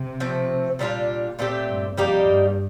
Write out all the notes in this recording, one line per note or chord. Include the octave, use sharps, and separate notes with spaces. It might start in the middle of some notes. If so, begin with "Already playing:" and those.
Already playing: C3
F3 A3 C4
A#2 G3 D4 F4
A#2 A3 C4 G4
G2
F2 G3 A#3 D#4 G4
G2